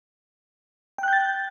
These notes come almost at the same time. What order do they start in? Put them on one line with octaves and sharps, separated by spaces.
G5 F#6 G6 A6